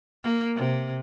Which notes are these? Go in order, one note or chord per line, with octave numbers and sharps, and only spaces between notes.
A#3
C3